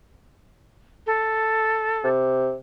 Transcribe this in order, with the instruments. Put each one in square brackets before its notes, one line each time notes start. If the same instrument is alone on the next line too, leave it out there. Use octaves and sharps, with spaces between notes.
[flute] A4
[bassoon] C3